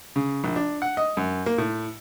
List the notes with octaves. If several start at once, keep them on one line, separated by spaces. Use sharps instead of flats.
C#3
A#1
D4
F#5
D#5
F#2
A#3
A2